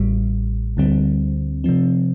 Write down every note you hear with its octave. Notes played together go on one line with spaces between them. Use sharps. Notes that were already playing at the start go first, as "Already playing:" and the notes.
Already playing: A1 A2 G3
D2 D3 G3 C4
C3 F3 C4